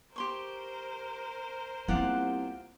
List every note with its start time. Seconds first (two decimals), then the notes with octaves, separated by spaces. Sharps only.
0.16 G4 A#4 C5 C6 C#6
1.88 C2 A#3 B3 F4 G4 F#5